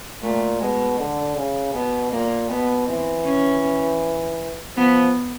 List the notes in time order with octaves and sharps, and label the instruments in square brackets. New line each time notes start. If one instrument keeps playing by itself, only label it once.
[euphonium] A#2 [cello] A3
[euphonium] B2 [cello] G#3
[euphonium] D3
C#3
[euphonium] B2 [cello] B3
[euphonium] A#2 [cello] A#3
[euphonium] B2 [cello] B3
[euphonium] E3 [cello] C4
[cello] C#4
[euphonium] F3 [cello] B3